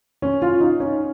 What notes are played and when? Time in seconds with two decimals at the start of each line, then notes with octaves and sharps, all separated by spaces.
0.22 C#4
0.42 F4
0.61 D#4
0.80 C#4